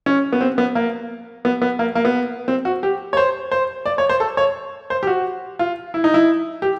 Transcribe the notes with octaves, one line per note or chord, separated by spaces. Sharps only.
C#4
B3
C4
B3
A#3
B3
B3
A#3
A#3
B3
C4
F#4
G4
C#5
C5
C5
D5
C#5
C5
A4
C#5
C5
G4
F#4
F4
E4
D#4
E4
G4